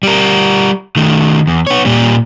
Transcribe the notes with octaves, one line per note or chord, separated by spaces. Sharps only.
G3 A#4
D#3 A3
E2
B3 C#5
A#2 G3